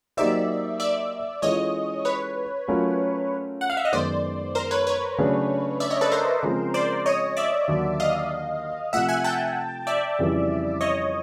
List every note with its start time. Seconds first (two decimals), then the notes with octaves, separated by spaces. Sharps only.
0.17 F#3 A#3 D#4 G4 C5 D5 E5
0.80 D5 E5
1.42 E3 G#3 C#4 F4 A4 C#5 D#5
2.05 B4 C#5
2.68 F#3 A3 C#4 F4 A#4
3.61 F#5
3.70 F5
3.77 E5
3.85 D#5
3.92 F#2 D#3 G#3 B3 C5 D5
4.55 A#4 C5
4.71 B4 C#5
4.87 B4 C#5
5.18 C#3 F#3 A3 D4
5.80 D5 E5
5.90 C#5 D#5
6.01 A4 B4
6.11 A#4 C5
6.43 C#3 F3 G#3 C4
6.74 C5 D5
7.06 C#5 D#5
7.37 D5 E5
7.68 D#2 D3 F#3
8.00 D#5 F5
8.93 C3 F3 A3 E5 F#5
9.09 F#5 G#5
9.24 G5 A5
9.87 D5 E5
10.19 F2 C#3 E3 G3
10.81 C#5 D#5